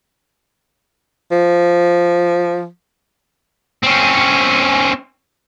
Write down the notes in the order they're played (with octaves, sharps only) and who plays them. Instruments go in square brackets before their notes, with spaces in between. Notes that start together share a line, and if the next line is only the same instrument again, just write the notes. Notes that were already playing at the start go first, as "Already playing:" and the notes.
[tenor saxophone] F3
[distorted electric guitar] C4 C#4